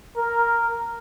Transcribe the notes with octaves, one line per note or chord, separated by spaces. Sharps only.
A#4